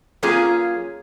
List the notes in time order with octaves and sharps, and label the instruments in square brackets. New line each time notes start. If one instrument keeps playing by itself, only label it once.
[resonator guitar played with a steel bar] F#3 A#3 C#4 F4 G#4